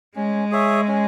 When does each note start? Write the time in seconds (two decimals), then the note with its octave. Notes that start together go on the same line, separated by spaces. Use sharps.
0.15 G#3 C#4
0.52 G#4 C#5 E5
0.88 C#4